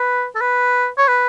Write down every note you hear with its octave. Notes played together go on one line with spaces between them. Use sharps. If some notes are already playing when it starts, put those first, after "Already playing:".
Already playing: B4
A4
B4
C#5
B4